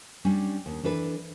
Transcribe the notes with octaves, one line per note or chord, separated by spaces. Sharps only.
G3 C#4 D4
D#2
E3 D4 A4 B4